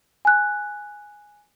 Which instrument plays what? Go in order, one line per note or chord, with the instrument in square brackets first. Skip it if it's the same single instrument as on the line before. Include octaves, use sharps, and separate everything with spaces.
[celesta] G#5 F#6